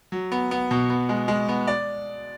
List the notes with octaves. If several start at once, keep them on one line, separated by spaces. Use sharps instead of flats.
F#3
B3
B3
B2
B3
G#3
G#3
B3
D5